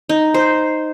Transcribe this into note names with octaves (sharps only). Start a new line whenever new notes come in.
D#4
C5